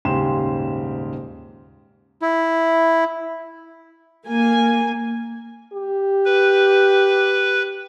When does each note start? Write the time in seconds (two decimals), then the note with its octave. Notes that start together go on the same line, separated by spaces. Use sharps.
0.05 D#1 G#2 C#3 G4 C6 E7
2.22 E4
4.26 A#3 G#5
5.73 G4
6.25 B4